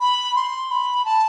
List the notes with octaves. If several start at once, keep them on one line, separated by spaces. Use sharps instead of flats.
B5
C6
B5
A5